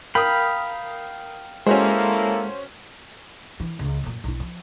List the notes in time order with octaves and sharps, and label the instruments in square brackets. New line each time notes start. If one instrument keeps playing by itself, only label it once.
[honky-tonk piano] A#4 D#6 [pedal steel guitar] F5 G5 B5
[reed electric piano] G#3 [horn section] A#3 E4 A4 [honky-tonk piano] C#4 F#4 C5
[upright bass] E3
C#2
F#2 A#2
B1 E4
F3